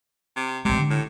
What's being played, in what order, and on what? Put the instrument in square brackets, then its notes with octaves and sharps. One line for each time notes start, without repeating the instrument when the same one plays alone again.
[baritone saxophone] C3
[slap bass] A1 G#3 [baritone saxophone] C3
[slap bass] D3
[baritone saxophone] A2